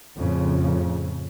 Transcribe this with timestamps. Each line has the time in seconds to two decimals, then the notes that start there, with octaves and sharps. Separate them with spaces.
0.17 F2 A2 C#3